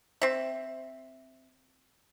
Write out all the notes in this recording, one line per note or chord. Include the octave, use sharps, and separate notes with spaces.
C4 E5